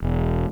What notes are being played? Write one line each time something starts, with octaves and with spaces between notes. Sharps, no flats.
E1